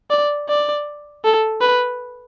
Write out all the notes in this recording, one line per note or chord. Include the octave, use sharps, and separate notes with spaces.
D5
D5
A4
B4